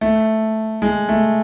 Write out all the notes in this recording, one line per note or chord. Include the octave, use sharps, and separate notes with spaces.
A3
G#3
A3